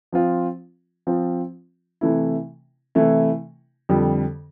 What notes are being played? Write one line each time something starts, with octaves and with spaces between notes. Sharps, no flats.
F3 C4 F4
F3 C4 F4
C3 E3 A3 E4
C3 E3 A3 E4
F2 D3 G3